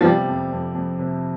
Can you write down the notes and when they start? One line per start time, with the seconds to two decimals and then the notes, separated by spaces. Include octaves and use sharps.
0.01 F3
0.05 C3 G3
0.29 F2
0.52 F2
0.75 F2
0.99 C3